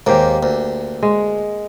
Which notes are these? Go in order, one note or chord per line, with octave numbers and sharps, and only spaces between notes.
D#2 G#2 A#3 G4
D2
G#3